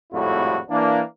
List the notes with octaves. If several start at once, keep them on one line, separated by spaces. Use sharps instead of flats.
G#1 F2 A2 G3 E4 F#4
E3 A#3 D4